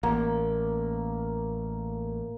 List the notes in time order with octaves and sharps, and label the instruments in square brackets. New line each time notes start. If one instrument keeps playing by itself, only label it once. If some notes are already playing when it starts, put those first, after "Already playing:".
[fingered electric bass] A1 [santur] A#3